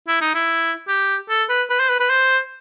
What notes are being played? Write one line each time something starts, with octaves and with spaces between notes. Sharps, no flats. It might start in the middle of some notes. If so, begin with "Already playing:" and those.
E4
D#4
E4
G4
A4
B4
B4
C5
B4
B4
C5